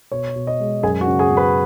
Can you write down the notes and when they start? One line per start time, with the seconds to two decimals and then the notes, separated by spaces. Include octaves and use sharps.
0.12 B2 C#5
0.36 B2
0.47 D#5
0.60 G#3
0.83 F#2 G#4 G#5
1.01 F#4 F#5
1.07 C#3
1.19 G#4 G#5
1.31 F#2
1.37 B4 B5